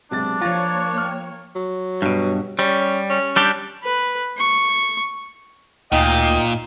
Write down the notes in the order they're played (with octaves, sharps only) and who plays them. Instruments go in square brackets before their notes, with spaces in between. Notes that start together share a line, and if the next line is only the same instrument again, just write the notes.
[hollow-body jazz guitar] B1 [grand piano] C3 G#3 A6 [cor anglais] D4
[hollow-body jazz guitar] F3 F4 [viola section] A#3 C#5 [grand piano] A5 A6 A#6
[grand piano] G5 F6
[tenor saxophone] F#3
[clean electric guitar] G2 B2
[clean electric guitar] G3 [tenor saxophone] C#4
[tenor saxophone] C#4
[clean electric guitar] G3 D4 G4
[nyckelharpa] B4
C#6
[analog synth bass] D2 [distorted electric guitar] A#2 [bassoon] D#4 [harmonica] D#5 G5